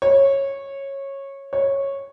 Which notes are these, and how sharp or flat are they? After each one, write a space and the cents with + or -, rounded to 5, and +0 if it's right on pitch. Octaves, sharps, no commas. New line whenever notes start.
C#5 -15
C#5 -10